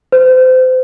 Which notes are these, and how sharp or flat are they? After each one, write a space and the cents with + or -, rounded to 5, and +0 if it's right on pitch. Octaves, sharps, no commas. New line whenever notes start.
C5 -30